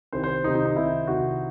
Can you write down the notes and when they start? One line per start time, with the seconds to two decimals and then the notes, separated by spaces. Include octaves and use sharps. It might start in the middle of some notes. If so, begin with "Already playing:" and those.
0.12 C2 C3 D#3 C5
0.24 C5
0.44 C2 C3 D#3 D#4
0.55 D#4
0.65 D#4
0.76 C2 C3 D#3 E4
1.07 C2 C3 D#3 F#4